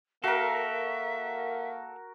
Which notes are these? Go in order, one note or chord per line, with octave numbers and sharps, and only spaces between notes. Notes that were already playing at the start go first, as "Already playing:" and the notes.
A#3 F#4 A4 A#4 E5 F5